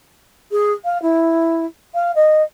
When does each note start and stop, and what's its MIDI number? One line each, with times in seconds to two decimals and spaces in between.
0.51 0.72 68
0.84 1.00 77
1.02 1.65 64
1.94 2.14 77
2.15 2.42 75